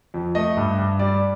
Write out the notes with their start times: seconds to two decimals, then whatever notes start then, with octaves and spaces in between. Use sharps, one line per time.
0.14 F2
0.35 A3 D#5
0.57 G2
0.78 G2
0.99 G3 D5